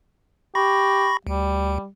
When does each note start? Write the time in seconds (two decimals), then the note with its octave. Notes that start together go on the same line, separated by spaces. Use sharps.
0.55 G4 B5 C#6 A#6
1.27 D2 G3